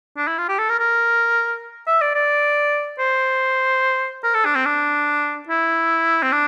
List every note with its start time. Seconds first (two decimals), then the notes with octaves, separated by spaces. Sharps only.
0.17 D4
0.28 E4
0.38 F4
0.49 G4
0.59 A4
0.69 A#4
0.80 A#4
1.87 E5
2.02 D5
2.15 D5
2.99 C5
4.24 A#4
4.34 A4
4.45 D4
4.55 C4
4.66 D4
5.49 E4
6.23 C4
6.32 D4